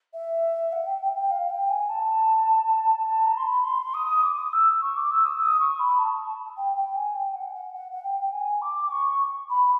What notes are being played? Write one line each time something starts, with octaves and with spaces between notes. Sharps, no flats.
E5
F#5
G5
G5
G5
F5
G5
G#5
A5
A5
A#5
C6
B5
C6
D#6
D6
D#6
E6
C#6
D6
E6
D#6
D#6
C#6
B5
A5
G5
G5
G#5
G5
F#5
F#5
F#5
F#5
G5
G5
G#5
D6
C#6
B5